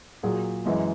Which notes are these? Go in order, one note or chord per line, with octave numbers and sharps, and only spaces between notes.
A#2 F#3 G#4
F#2 E3 G#3